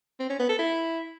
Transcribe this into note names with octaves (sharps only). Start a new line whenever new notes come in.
C4
C#4
B3
A4
E4